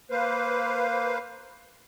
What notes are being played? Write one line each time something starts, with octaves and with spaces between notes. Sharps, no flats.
A#3 B4 C5 F5